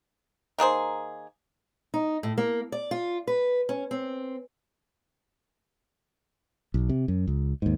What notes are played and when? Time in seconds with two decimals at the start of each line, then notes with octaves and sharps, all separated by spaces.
0.58 D#3 A#3 G#4 C5
1.94 D#4
2.23 A2
2.38 A#3
2.72 D5
2.91 F4
3.27 B4
3.69 C#4
3.91 C4
6.74 B1
6.89 C3
7.08 F#2
7.28 C#2
7.62 D#2 G#2